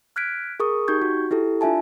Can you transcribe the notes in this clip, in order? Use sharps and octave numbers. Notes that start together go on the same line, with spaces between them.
F6 F#6 G#6 B6 D7
G#4 A#4 C#6 D#6
D#4 G4 C#6 G6 G#6
F#4
E4 G4 A4
D4 F4 E5 G#5 A5